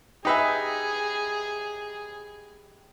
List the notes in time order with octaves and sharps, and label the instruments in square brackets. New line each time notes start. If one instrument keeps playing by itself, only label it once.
[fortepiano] D#4 B4 E5 [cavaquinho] G4 G#5 [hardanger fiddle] G#4